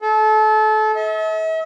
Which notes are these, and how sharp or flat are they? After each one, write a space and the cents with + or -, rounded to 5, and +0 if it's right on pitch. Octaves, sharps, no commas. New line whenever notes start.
A4 -30
E5 -45